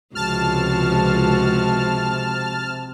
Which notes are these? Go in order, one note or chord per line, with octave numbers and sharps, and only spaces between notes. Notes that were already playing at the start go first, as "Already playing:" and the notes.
C#2 C3 F3 G#3 F#4 A5 F6